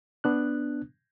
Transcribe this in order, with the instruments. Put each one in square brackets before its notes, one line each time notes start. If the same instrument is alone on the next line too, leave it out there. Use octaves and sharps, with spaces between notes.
[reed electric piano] B3 D4 F#6